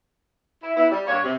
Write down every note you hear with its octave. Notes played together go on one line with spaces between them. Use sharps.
E4
B3 E4
G3
G2 A#3 C#5
C3